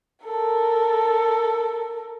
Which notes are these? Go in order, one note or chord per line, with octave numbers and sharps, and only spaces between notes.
A4 A#4